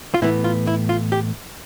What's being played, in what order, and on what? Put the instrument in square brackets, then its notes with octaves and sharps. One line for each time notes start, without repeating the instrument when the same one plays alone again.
[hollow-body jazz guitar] F4
A2 E3 B3 E4
F4
E4
F4
G4